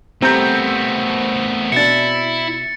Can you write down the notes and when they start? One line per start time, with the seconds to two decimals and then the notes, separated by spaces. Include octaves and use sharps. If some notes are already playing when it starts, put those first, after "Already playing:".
0.22 A3 B3 C4 G4 C5 A#5 G6
1.72 B2 D4 E4 A6 C#7